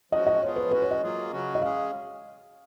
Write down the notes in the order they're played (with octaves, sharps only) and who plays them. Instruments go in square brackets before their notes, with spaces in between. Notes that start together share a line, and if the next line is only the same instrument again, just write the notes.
[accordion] F3 G#3 C#4 F#4 [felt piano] D#5
[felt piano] D#5
[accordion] F3 B3 F4 G#4 [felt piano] C#5
[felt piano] B4
[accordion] G#3 C#4 F#4 [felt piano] B4
[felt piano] C#5
D#5
[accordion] F#3 A#3 F4 G#4
C#3 F#3 C#4 F#4
[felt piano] D#5
[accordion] G#3 C#4 G#4 [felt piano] F5